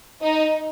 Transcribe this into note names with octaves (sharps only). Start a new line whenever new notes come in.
D#4